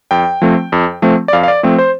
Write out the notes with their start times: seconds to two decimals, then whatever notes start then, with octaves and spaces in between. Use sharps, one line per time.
0.11 F2 G5
0.42 F3 A3 C4
0.72 F2
1.02 F3 A3 C4
1.28 D5
1.33 F2 F5
1.43 F5
1.48 D5
1.63 F3 A3 C4
1.78 C5